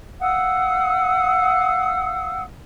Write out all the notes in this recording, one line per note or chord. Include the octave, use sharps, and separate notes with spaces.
F5 F#5 D#6 E6